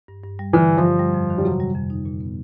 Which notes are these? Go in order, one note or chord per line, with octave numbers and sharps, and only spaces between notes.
G2
G2
G3
D3 E3
G2
F3
G2
G3
F2
D#3
G3
C3 F#3
G3
F2
D#4
A#2
B3